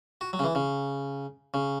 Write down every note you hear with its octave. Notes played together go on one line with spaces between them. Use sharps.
F#4
F#3
C#3
E3
C#3
C#3